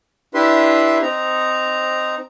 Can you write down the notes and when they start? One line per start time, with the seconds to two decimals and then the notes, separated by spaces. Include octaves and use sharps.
0.34 D4 E4 G4 B4 E5 C6
1.02 C4 D#4 A#5